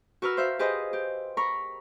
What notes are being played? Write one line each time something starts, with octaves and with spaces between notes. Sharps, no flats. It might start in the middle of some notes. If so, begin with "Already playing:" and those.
F#4 A#4 B4 E6 F6
C5 E5 F5
G4 G#4 B4 C5 D#5
G4
A#4 A#5 B5 C#6